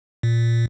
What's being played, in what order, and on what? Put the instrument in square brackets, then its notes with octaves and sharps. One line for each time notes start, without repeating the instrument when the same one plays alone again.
[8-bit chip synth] A#2